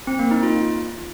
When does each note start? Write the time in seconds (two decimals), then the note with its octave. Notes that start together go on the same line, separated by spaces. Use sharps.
0.07 C4
0.19 A#3
0.31 D#4
0.43 F4